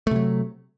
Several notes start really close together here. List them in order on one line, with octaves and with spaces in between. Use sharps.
A3 C3 F#3